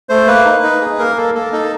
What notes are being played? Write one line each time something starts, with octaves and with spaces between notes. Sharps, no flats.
A3 C5
A#3 B4
D#4
D#4
G#4
A#3 A#4
A#3 A4
A#3 A4
D#4 A4